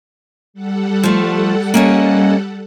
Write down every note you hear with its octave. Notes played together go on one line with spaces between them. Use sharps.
G3 A4 F#5
F3 A3
A#3 C#4 D#5